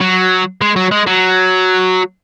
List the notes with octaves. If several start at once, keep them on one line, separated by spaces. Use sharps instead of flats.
F#3
G#3
F#3
G#3
F#3